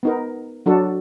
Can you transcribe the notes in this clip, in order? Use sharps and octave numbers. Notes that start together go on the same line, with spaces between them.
B3 D#4 A#4
F#3 D4 F#4 A4